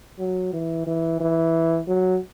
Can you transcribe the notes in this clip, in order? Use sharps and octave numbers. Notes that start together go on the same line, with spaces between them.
F#3
E3
E3
E3
F#3